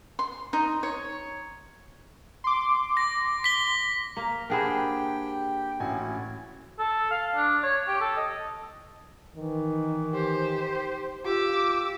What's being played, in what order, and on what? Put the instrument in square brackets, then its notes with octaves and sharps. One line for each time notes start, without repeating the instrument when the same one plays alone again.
[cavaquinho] C6
D#4
C#5
[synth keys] C6 D6
[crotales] A#6
B6 G7
[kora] A#3 [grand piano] A#5
[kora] D4 G#4 C5 [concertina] G4 G5 [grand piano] A#4 F#5 B5
[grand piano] A1 F#4 G#5 [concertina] C#4 E4
[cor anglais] A4
F5
D4
C#5
G4
A4
D#5
[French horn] D#3 [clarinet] E3
[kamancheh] G4 C5
[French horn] F4 [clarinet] G4 [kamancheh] D6 E6